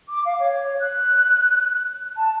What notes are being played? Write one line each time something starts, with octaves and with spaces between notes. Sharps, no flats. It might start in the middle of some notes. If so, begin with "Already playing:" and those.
D6
F5
C#5
F#6
A5